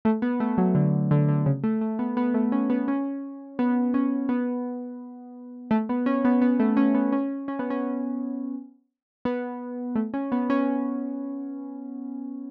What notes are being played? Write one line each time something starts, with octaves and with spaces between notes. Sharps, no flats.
A3
B3
A3
F#3
D3
D3
D3
C#3
A3
A3
B3
B3
A3
C#4
B3
C#4
B3
C#4
B3
A3
B3
C#4
B3
B3
A3
C#4
B3
C#4
C#4
B3
C#4
B3
A3
C#4
B3
C#4